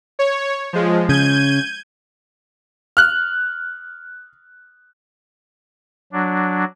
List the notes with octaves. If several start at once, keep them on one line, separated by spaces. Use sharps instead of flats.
C#5
F3 G#3
C#3 G6 G#6 D#7
F6 F#6
F#3 D4